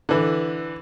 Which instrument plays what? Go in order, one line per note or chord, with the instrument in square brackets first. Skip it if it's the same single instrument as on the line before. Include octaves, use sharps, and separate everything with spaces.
[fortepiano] D3 E3